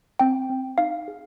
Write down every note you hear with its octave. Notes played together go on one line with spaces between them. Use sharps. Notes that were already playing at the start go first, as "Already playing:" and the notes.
C4 G5
C4
D#4 F5
G#4